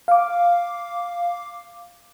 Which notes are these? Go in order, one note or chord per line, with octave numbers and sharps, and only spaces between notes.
F5 D6